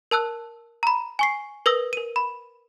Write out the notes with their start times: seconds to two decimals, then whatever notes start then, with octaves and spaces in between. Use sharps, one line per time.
0.11 A#4 A5 E6 F#6
0.83 A#5 B5
1.19 G#5 C#6 C7
1.66 A#4 B4 D#6 E6 A#6
1.93 A#4 D#7
2.16 B5